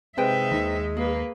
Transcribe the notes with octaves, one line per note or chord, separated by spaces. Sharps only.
C3 G#3 D#4 B4 C5 E5 G5
D#2 D#3
A#3 G#4 B4